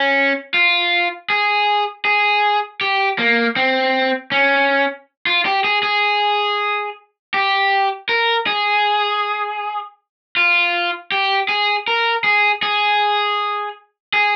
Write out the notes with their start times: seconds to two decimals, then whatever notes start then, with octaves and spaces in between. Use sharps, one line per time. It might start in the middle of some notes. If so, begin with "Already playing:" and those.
Already playing: C#4
0.54 F4
1.30 G#4
2.05 G#4
2.81 G4
3.19 A#3
3.56 C4
4.32 C#4
5.27 F4
5.46 G4
5.64 G#4
5.83 G#4
7.34 G4
8.09 A#4
8.47 G#4
10.37 F4
11.12 G4
11.49 G#4
11.88 A#4
12.24 G#4
12.63 G#4
14.14 G#4